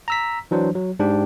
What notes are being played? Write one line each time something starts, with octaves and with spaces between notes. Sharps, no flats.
A#5 E6 B6
E3 F#3 D4 C5
F#3
G#2 D4 G4 G5